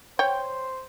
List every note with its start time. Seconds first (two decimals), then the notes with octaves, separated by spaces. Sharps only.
0.19 C5 C#5 G5